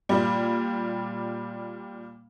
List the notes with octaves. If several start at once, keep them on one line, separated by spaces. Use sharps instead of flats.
A#2 G3